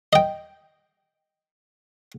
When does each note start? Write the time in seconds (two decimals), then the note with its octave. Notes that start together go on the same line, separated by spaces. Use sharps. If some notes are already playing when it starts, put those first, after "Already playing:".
0.13 D#5 G5